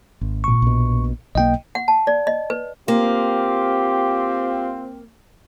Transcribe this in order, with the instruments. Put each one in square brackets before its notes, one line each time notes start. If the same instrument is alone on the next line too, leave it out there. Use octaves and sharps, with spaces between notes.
[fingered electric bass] G#1
[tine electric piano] A#2 C#6
[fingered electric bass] A#1 B2
[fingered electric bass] B1 E3 A#3 [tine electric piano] D#5 G5
[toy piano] F#5
A5
D5
D#5
B4
[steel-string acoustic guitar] A#3 [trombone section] C4 [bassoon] F4 [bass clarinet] G4